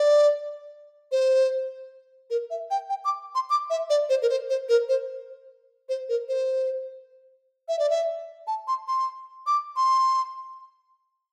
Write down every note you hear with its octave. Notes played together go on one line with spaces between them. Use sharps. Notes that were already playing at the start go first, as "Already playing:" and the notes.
Already playing: D5
C5
A#4
E5
G5
G5
D6
C6
D6
E5
D5
C5
A#4
C5
C5
A#4
C5
C5
A#4
C5
E5
D5
E5
A5
C6
C6
D6
C6